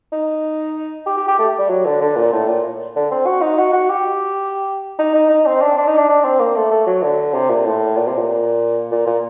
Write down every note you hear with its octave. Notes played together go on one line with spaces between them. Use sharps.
D#4
G4
G4
G4
A3
G3
F#3
D3
D3
A#2
A2
A#2
D3
C4
F#4
D#4
F#4
F#4
G4
D#4
D#4
D#4
C4
D4
D4
D#4
D4
D4
C4
A#3
A3
A3
F#3
D3
C3
A#2
A2
A#2
C3
A#2
A#2
A#2